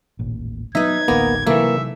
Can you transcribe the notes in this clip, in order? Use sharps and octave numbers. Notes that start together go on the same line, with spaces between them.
D#1 A1 A#2
F#3 B3 D#4 B4 E5 G#6
D1 A1 D2 A#3 B3 A#4
C3 E3 F#3 A3 A#3 E5